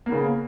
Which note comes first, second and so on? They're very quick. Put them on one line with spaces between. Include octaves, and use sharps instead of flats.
A#3 B3 C#3